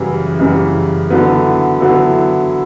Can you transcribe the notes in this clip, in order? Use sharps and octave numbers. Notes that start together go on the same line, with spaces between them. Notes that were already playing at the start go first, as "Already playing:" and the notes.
Already playing: F#2 C#3 E3 G3
F#2 C#3 E3 G3
D3 F#3 B3 E4
D3 F#3 B3 E4